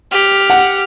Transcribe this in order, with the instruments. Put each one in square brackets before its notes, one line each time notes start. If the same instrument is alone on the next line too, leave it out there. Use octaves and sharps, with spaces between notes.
[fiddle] G4 [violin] F6
[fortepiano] F#5